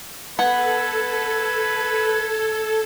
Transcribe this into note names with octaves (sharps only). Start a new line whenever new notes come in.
B3 A4 B4 F#5 G#6